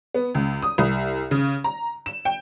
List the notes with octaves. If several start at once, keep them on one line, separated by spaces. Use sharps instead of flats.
B3
C#2
D#6
C2
C#3
A#5
E7
G5